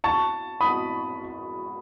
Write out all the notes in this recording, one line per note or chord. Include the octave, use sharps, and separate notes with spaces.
A5 C#6
B5 D#6